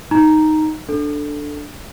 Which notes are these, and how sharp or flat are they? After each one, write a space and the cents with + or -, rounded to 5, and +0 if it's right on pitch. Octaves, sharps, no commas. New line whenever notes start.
D#4 +0 A#5 +0
D4 +0 A4 +0